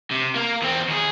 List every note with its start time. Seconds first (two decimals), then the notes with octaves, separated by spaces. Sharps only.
0.11 C3
0.36 A#3 A#4
0.62 E2 C4
0.88 D#2 G#4